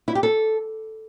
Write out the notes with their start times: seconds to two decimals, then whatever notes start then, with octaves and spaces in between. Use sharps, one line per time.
0.08 E4
0.15 G4
0.23 A4